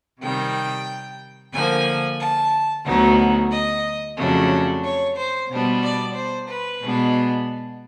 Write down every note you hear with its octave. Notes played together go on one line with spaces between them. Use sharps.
C3 D#3 G3 G5
D3 F3 A#3 G#5
A5
D2 D3 F#3 B3 D#4
D#5
F2 C#3 F#3 A3 D4
C#5
C5
B2 G3 B3 D4
D5
C5
B4
B2 G#3 B3 D4